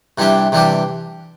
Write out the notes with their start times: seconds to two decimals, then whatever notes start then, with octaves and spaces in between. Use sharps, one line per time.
0.18 C3 E3 G3 D4 G4
0.52 C3 E3 G3 D4 G4